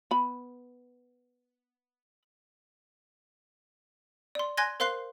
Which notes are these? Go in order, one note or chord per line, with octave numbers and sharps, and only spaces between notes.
B3 B5
D5 C6
G#5 C6 F#6 G#6 A#6
A#4 C5 F5 C6 F#6 C7